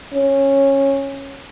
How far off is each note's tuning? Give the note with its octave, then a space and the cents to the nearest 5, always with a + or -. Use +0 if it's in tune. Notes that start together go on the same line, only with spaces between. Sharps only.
C#4 -15